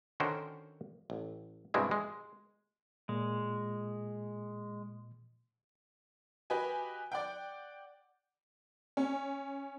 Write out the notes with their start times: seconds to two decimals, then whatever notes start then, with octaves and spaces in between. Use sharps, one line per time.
0.20 D3 D#3 C#4 F#4 A#4 C5
1.10 A1
1.74 G2 B2 G3 G#3 C4 E4
1.91 G#3
3.09 A#2 G#3
6.50 F#4 G4 B4 D#5 G#5
7.12 D5 F#5 G5
8.97 C#4